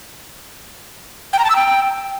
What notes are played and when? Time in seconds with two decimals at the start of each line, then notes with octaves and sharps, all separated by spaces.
1.33 G5
1.39 A#5
1.44 A5
1.50 E6
1.56 G5